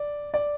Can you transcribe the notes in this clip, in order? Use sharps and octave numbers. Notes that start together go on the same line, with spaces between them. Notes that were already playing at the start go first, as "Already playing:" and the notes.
Already playing: D5
D5